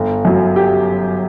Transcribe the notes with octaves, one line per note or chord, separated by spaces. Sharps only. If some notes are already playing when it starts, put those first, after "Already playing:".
Already playing: G1
F#2 F#3
G4